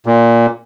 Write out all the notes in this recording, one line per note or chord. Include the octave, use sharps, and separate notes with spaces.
A#2